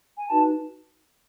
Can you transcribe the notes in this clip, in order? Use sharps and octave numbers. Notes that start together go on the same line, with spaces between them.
G#5
D#4 F#4 B4 A5